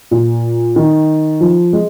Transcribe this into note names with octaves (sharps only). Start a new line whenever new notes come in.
A#2
D#3
F3
G#3